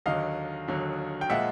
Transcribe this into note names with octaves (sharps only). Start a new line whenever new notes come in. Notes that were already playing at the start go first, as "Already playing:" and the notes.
D#2 D3 F#3 D#5 F5
D#2 D3 F#3
G5
A#2 F3 G#3 E5 F#5